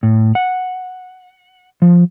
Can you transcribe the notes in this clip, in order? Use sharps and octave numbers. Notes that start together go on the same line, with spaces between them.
A2
F#5
F3